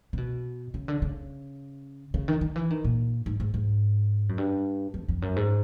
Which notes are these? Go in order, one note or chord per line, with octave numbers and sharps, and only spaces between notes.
C3
B2
C#3
D3
C#3
C#3
D#3
D#3
E3
D#3
A#2
G#2
G#2
G#2
F#2
G2
F2
F2
F#2
G#2